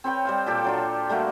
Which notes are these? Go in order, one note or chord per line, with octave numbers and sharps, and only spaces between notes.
C4 B4 C#5 G5
G3 C5 F5
A#2 G4 A4 D6
F#3 D4 F4
G4
G3 A3 A#3 F#4